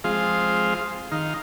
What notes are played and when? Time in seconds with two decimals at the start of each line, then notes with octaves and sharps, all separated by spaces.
0.04 F3 G#3 C4 F4 G#4 F5
1.12 D#3 D#4 F5